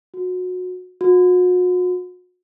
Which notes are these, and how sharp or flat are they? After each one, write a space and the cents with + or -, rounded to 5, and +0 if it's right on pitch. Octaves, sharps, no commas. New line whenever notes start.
F#4 -25
F#4 -40